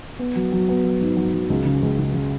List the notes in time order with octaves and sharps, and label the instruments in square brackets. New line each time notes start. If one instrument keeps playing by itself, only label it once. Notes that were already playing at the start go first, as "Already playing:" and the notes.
[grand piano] B3
F#3
F#3
B3
F#3
G#2
F#3
F#3
C#2
C#3
C#2
C#3
C#3